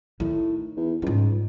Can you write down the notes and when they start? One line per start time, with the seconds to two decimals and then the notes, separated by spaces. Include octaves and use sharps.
0.20 A2 D#3 D#4
0.77 E2
1.02 C#2 G#2 G3